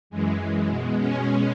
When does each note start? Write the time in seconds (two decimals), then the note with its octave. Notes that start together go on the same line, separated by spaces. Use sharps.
0.10 F#2 E3 G#3
0.68 B2 G#3
0.96 C#4